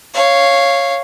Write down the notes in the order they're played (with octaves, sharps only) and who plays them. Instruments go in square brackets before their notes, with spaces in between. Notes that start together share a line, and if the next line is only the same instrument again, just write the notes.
[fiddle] C#5 F5